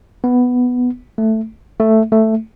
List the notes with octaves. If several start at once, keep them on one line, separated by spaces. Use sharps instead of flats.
B3
A3
A3
A3